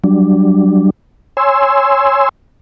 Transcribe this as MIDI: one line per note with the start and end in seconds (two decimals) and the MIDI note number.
0.04 0.90 54
0.04 0.90 55
0.04 0.90 62
1.37 2.29 73
1.37 2.29 80
1.37 2.29 84
1.37 2.29 88